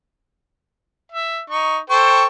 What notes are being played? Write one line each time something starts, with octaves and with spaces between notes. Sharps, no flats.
E5
D#4 C#6
A4 C5 G5 C#6